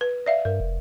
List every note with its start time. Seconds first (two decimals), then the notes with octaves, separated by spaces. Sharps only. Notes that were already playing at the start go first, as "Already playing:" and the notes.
0.01 B4
0.26 D5 E5 F5
0.45 G2 A#4
0.60 F1